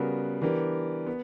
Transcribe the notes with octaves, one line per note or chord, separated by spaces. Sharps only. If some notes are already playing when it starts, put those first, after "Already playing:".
Already playing: C#3 G3 B3 F#4 A#4
E3 B3 D4 G4 A#4
B3